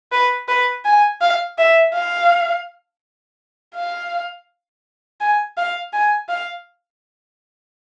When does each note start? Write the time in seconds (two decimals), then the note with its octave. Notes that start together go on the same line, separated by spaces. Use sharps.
0.12 B4
0.48 B4
0.85 G#5
1.21 F5
1.58 E5
1.94 F5
3.75 F5
5.21 G#5
5.57 F5
5.93 G#5
6.29 F5